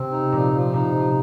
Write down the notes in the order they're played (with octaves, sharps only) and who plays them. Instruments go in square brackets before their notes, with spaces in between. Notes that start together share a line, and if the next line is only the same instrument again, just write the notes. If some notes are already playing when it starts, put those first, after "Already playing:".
Already playing: [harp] C3 [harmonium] C4
[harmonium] D#4
[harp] A#2 [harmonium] F3
[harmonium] F3
[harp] C3 [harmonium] D#4
[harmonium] F3